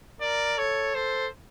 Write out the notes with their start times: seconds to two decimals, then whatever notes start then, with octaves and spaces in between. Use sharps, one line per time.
0.21 A#4 D5
0.58 A4 C#5
0.95 A4 C5